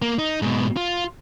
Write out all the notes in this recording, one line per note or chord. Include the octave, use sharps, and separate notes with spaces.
A#3
D#4
G#2 B2
F4